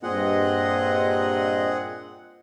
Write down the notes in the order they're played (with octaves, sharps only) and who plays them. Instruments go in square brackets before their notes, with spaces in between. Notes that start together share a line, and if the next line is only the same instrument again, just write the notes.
[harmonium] G2 D#5 [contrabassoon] A#2 [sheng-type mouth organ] C4 G#4 F#5